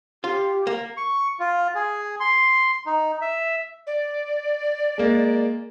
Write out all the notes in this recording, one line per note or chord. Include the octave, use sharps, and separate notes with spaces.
F4 G4
A#3
C#6
F4
G#4
C6
D#4
E5
D5
G#3 A#3